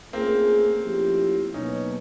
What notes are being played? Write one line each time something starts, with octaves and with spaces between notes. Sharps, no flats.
A3 A#3 C4 C#4 F4 G#4
F3 A3 C#4 E4 G4
B2 F#3 A#3 C#4 D#4